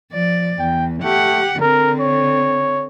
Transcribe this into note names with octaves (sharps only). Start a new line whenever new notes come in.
F3 D5
E2 G5
A3 G4 F#5
D3 C4 A#4
C#5